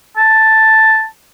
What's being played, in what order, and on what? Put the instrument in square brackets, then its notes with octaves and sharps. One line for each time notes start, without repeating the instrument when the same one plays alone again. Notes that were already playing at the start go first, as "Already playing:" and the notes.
[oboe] A5